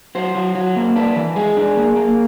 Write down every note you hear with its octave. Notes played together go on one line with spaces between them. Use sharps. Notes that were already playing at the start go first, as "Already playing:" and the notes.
F#3 C5
F#3
F#3
A#3
D4 B4
E3
G#3 G#4
D4
A#3
A#3